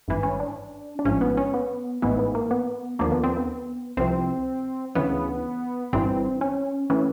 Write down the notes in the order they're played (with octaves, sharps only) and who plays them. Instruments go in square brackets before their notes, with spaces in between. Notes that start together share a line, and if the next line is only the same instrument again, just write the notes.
[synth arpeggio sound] G#1 G2 E3
C#4
D4
D4
A1 G#2 F3 C#4
B3
C#4
B3
A1 G#2 E3 B3
B3
A#3
B3
D#2 D3 F3 A#3
B3
C4
B3
C2 C3 F3 C4
D2 C#3 E3 B3
G1 G2 E3 C4
C#4
A2 E3 C#4